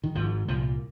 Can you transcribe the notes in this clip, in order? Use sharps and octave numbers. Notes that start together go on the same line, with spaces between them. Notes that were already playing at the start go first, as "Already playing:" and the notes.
D#3
G#1 G#2 F3
C2 A#2 F3